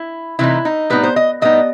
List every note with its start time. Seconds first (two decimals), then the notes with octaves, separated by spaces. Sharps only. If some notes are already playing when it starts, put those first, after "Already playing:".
Already playing: E4
0.39 C3 E3 A3 D#4 E4
0.65 D#4
0.90 A2 G3 B3 D#4 B4
1.03 C5
1.16 D#5
1.42 A2 G3 B3 D#4 D#5